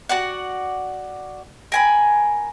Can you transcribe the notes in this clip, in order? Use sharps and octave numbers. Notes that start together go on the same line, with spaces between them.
F#4 D5 F#5
A#4 G#5 B5